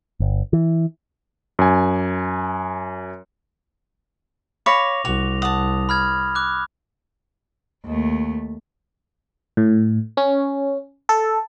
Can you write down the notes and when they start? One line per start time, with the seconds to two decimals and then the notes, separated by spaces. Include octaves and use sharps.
0.20 G1
0.53 E3
1.59 F#2 G#5
4.66 C#5 F5 B5 D6 A#6 F7
5.05 C2 F#4 F7
5.42 F#5 A5 D#6
5.89 B5 F6 G#6
6.35 D6 F#6
7.86 D#2 A3
9.57 A2
10.17 C#4
11.09 A4